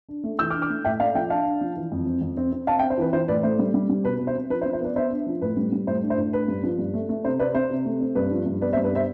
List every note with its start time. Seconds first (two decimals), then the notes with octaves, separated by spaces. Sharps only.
0.09 D4
0.24 A3
0.39 E3 E6 G6
0.50 D6 F6
0.54 D4
0.62 D6 F6
0.70 A3
0.85 A2 E5 G5
1.00 A3 D5 F5
1.15 F3 E5 G5
1.30 D4 F5 A5
1.46 D4
1.61 F3
1.76 E3
1.92 F2
2.06 C4
2.21 F2
2.37 C4
2.52 C4
2.67 C4 F5 A5
2.79 E5 G5
2.83 C4
2.90 C5
2.98 E3 B4
3.13 E3 C5
3.28 A2 B4 D5
3.43 A3 C5
3.59 G3
3.74 G3
3.89 G3
4.04 B2 B4
4.20 B2
4.27 C5
4.35 C4
4.50 F3 B4
4.62 C5
4.66 F3
4.73 C5
4.81 B3 B4 D5
4.96 B3 C5 E5
5.11 D4
5.27 F3
5.42 A2 B4
5.57 G3
5.72 G3
5.87 A2 C5
6.03 D4
6.10 C5
6.18 A2
6.33 D4 B4
6.48 G2
6.63 F3
6.79 G2
6.94 A3
7.09 A3
7.25 C3 C5
7.39 C4 B4 D5
7.55 C4 C5
7.70 C3
7.85 A3
8.01 C4
8.15 G2 B4
8.31 F3
8.46 G2
8.61 B3 B4 D5
8.73 C5 E5
8.77 G2
8.84 B4 D5
8.92 B3 C5 E5